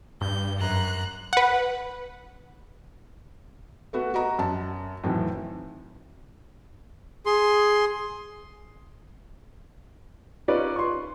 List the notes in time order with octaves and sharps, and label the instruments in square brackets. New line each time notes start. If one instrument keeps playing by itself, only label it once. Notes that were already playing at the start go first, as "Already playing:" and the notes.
[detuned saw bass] G2 [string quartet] G6
[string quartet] F#2 A#5 F#6
[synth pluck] B4 F#5
[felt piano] A3 B3 F#4
F#4 D#5 A#5
F#2 A5
F2 A2 D#3 E3 F#3
[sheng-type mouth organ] G#4 C6
[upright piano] C#4 D#4 F4 B4 C#5 D5
C6 C#6